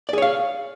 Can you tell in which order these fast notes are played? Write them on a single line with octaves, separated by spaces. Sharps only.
D5 G#4 C#5 F5